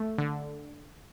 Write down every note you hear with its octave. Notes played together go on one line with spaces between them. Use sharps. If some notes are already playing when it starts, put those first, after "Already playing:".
Already playing: A3
D3